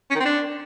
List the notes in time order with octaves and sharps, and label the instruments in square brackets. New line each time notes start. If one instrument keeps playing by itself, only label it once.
[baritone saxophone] C#4
D#3
C4
D4